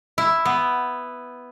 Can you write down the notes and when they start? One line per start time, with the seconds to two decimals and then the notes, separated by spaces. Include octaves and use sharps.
0.18 E4
0.45 B3